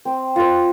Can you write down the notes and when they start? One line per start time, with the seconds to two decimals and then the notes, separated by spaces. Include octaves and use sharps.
0.05 C4
0.36 F4 C5